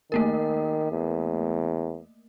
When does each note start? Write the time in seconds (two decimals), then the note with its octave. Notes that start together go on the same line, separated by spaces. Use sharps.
0.12 D#3 A3 A#3 A#4
0.92 E2